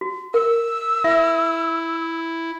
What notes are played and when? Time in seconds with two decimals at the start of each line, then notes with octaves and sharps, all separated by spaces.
0.01 F#4
0.34 A#4 E6
1.04 E4 E5